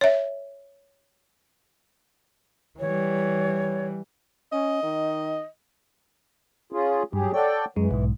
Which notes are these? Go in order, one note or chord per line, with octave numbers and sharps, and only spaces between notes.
C#5 E5
E3 G3 C#5
C#4 D#5
D#3
C#4 F4 G#4
G2 F#3 G4 G#4
A4 C#5 D5 F#5 G5
F#2 E3 G#3
B1 G#2